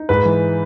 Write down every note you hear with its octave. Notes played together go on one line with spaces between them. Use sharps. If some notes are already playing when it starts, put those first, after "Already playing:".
Already playing: D#4
G#2 B4
E3